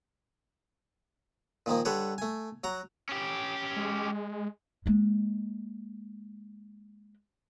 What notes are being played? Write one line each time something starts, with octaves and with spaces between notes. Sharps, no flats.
A#2 D#3 F3 A#3
D3 G3 A4 B4 C#5
A3 G#5
F#3 F#4 A#5
C#4 G4
G#3
G#3 A#3